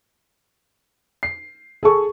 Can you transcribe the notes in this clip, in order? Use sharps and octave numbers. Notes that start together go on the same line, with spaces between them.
C7
G#4 A4 C#6